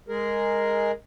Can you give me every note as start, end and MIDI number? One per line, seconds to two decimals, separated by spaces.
0.09 0.92 56
0.09 0.92 68
0.09 0.92 70